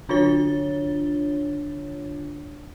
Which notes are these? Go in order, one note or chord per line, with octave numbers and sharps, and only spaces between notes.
D3 D4 F4 C#5 A6 G7